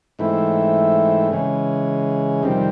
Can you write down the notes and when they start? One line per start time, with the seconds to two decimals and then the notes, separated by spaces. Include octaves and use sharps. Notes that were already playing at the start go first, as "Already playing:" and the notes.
0.19 G#2 E3 A3 C4 E4
1.31 C#3 E3 G#3 C#4
2.43 F2 C3 D#3 G3 C4